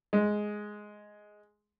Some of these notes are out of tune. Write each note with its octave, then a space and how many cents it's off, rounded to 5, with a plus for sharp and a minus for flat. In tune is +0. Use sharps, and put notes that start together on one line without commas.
G#3 +5